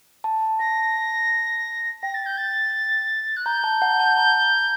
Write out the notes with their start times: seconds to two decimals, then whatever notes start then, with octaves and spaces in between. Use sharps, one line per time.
0.24 A5
0.60 A5 A#6
2.03 G5 A#6
2.14 A6
2.26 G6
2.38 A6
3.37 F#6
3.46 A#5 G6
3.64 A5
3.82 F#5
4.00 A5
4.18 A#5
4.41 A#5